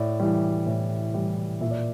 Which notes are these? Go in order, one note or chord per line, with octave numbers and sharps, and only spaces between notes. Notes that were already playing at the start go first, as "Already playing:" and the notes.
Already playing: A2 D5
E3 G3
A2
E3 G3
A#2 E5
D5